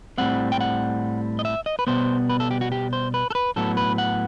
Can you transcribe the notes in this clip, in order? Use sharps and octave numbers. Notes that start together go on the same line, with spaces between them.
A2 G3 C4 F#5
G5
F#5
D#5
E5
D#5
B4
B2 G3 B3 C5
B4
A4
G4
F#4
G4
C5
B4
A4
B4
A2 F#3 B3 A4
B4
F#5